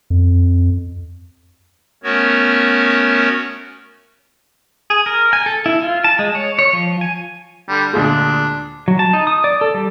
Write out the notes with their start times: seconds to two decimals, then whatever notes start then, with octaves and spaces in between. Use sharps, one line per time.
0.10 F2
2.04 A3 B3 C#4 F#4 A#4 C#5
4.90 G#4
5.06 A#4
5.33 G#5
5.46 A4
5.66 E4
5.82 F4
6.04 A5
6.19 G#3
6.35 C#5
6.59 C#5
6.73 F3
7.01 G#5
7.69 D3 G3
7.93 D2 A#2 G#3 D4
8.88 F#3
8.99 A5
9.13 D#4
9.27 D#6
9.44 D5
9.61 A4
9.74 G3